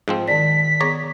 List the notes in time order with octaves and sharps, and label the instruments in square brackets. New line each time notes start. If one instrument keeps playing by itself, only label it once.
[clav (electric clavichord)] G#2 F3 C4
[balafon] D#3 D5 [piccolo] B6
[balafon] B3 G#4 [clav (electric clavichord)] C#5 D5 A#5